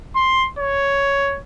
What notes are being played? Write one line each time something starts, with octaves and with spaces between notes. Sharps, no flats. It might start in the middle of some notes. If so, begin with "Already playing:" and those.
C6
C#5